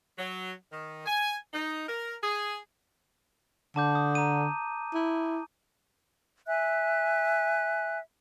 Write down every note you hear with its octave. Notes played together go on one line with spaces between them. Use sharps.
F#3
D#3
G#5
D#4
A#4
G#4
D3 A5 D6 G6
D#6
A#5 D#7
E4
E5 G#5 F#6